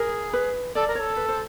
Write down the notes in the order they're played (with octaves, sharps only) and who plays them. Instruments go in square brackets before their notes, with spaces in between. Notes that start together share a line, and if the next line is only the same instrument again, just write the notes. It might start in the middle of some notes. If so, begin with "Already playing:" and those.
Already playing: [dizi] G#4 [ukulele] A#4
[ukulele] B4
[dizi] A4 [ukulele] D5
[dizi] A#4
[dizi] A4 [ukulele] C#5
[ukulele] B4
C5